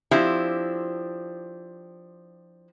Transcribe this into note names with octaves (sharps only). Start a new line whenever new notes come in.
F3 C4 D4 E4 G4